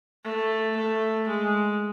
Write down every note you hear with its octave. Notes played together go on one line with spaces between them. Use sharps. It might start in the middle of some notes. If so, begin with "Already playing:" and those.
A3
A3
G#3